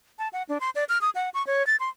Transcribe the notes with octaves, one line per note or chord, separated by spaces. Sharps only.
A5
F#5
D4
C6
D5
F6
D#6
F#5
C#6
C#5
A6
C6